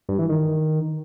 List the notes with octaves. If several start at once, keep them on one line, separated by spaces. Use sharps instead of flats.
G2
E3
D#3